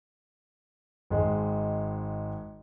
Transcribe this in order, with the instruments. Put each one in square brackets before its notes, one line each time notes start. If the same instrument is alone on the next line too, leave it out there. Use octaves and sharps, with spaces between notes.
[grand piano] G#1 G#3